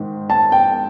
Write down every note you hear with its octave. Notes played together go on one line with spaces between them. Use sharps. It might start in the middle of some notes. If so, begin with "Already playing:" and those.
Already playing: G#2 D#3 G#3
A5
G5